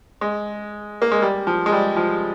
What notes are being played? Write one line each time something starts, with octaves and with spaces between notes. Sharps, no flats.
G#3
A#3
G#3
G3
F3
G#3
G3
F3